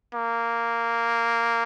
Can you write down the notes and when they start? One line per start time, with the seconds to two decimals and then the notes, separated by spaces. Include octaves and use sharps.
0.15 A#3